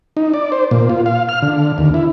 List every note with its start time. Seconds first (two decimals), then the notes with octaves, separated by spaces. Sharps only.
0.17 D#4
0.34 D5
0.52 C5
0.71 A#2
0.89 F4
1.06 F5
1.29 F6
1.42 D3
1.78 D#2
1.94 E4